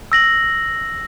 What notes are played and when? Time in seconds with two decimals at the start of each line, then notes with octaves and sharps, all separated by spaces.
0.12 E6 A#6 F#7